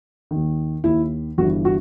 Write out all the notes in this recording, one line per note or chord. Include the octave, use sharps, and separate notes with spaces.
D#2 D#3
D#2 D#3 E4
G1 G2 E3 F#4
F#4